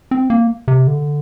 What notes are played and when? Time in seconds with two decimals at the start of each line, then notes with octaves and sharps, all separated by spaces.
0.11 C4
0.30 A#3
0.68 C3
0.87 D3